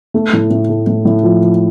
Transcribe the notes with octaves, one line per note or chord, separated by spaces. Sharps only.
A3
A2
A2
A3
A2
A2
F3
F3